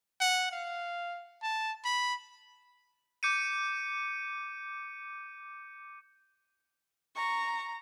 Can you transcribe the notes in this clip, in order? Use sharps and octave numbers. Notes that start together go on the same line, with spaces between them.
F#5
F5
A5
B5
D6 G6 C#7 D#7
A#5 C#6